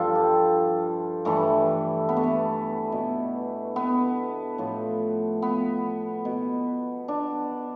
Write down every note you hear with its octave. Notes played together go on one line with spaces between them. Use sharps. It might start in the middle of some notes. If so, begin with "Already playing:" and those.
Already playing: G2 F3 F4 A4
G4
G2 E3 A3
B3
A3
B3
B2
B3
A2 F3
B3
B2
D4